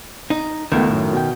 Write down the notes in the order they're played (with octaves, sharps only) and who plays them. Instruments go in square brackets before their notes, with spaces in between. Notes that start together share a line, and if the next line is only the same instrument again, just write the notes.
[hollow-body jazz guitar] D#4
[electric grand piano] C#2 A3 B3 [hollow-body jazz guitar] D#3
[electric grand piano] F#2 A2
B2 G5